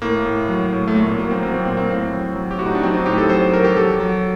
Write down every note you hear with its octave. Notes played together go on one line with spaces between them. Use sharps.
A2 A#3
A2
F#3
A2
A3
A#2 A#3
A#3
F#3 A#3
C4
F#3 A#3
C4
A#2 C4
A#3
A2 C4
F#3
F#3
G4
A2 F#4
D#4
D4
F#3 C4
D#4
A2 G4
A4
F#3 C5
F#3 A#4
G4
F#3 A4
F#3